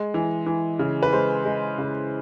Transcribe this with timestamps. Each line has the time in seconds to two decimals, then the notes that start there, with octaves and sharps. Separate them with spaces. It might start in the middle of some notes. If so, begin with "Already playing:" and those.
Already playing: G#3
0.14 E3
0.46 E3
0.79 C#3
1.03 B4
1.13 G#3 C5
1.45 G#3
1.78 C#3